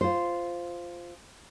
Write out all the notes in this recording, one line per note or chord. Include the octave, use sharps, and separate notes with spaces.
F4 C5